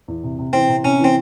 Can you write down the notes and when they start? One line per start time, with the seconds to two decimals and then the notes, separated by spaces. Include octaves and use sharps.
0.08 E2
0.24 C3
0.39 C3
0.53 E3 C4
0.69 C3
0.84 C3 C#4
0.99 E3 C4